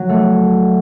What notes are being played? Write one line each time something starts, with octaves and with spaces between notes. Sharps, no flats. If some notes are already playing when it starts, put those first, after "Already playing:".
Already playing: F#3
A3